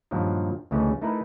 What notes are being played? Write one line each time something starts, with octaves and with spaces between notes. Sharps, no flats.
G2 A#2 D#3 F3 F#3
D2 C#3 E3 G#3 A3 C#4
A3 D#4 E4 A#4 B4